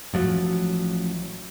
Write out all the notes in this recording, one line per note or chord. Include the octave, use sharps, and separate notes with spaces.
A1 F3 F#3